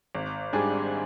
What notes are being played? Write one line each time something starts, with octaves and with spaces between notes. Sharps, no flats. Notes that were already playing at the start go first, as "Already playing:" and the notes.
G#1
G#2 G3 D4 G#4